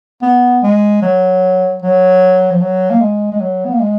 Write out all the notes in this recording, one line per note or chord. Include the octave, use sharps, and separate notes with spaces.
B3
G#3
F#3
F#3
F3
F#3
A#3
G#3
G#3
F#3
B3
A#3
G#3